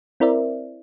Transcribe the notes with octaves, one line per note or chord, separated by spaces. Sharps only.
C4 E4 A#4 C5 D5 E5